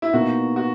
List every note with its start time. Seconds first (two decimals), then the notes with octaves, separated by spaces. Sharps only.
0.02 E4
0.13 B2 A#3 D#4 F#4
0.56 F#4